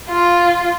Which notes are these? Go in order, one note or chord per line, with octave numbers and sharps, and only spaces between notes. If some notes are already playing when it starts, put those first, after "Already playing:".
F4